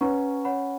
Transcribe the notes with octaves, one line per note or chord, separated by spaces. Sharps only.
C#4 B4 F#5 A#5 C#6
C#5 F#5 B5